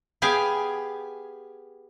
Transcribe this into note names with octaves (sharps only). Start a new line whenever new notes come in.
B3 G4 G#4 F5 G5 G#5